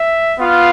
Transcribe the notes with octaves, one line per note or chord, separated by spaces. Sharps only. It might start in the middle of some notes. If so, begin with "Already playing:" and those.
Already playing: E5
B3 F4 F5